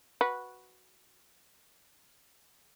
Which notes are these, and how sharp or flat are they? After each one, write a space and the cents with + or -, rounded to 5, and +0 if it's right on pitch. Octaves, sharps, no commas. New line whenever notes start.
F#4 +0 B4 -10